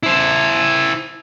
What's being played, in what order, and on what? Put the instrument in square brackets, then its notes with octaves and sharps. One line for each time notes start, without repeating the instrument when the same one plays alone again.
[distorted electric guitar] E4 C5